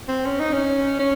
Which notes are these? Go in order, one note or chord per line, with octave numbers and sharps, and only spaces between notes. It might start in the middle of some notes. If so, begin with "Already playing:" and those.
C4
C#4
D#4
C#4
C#4